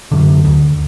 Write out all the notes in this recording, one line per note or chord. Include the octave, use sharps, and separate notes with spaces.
F#2 D3
D2